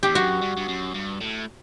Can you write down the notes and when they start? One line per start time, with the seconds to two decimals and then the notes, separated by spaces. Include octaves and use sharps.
0.03 E2 G4
0.15 F#2 F#4
0.42 G2
0.57 G2
0.69 F#2
0.95 G2
1.21 A2